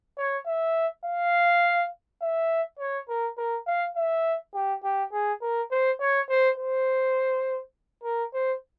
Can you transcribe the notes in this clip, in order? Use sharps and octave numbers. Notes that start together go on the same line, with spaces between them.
C#5
E5
F5
E5
C#5
A#4
A#4
F5
E5
G4
G4
G#4
A#4
C5
C#5
C5
C5
A#4
C5